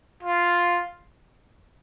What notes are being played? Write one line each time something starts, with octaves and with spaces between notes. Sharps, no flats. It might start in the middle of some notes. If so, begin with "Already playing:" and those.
F4